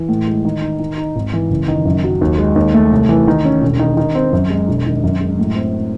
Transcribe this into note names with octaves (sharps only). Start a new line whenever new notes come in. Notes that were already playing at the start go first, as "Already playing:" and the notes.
Already playing: E3
A2
G#3
D#3
D#4
D#3
D#4
G#1
E3
F#1
D#3
F#2
F#3
D#2
G#3
D#2
A3
C2
E3
D#3
C#4
E1
D#3
D#3
C4
F#2
G#3
E1
D#3
F#2
G#3
A2
C4